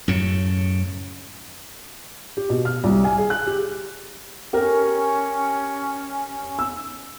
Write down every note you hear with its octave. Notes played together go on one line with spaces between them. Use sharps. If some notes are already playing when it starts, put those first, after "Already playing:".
F#2 A2 C#3
G4
B2
F6
C2
G#5
G#4
F#6
G4
C#4 G4 A#4
E6